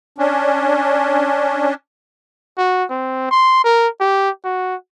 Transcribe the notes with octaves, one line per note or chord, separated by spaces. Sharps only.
C#4 D4
F#4
C4
C6
A#4
G4
F#4